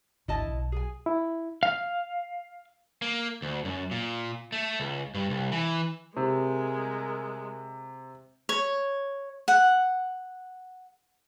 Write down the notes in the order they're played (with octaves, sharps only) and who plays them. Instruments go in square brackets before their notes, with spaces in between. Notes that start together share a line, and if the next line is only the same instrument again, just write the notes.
[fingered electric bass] G#1 D2 D4 [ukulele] E4 D#5 A5
[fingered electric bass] B1
[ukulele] G#4 G#5
[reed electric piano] E4
[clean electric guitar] F5
[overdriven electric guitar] A#3
D2
F#2
A#2
A3
C#2
G2
C2
E3
[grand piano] C3 [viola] G#3 [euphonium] A#4
[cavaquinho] C#5
F#5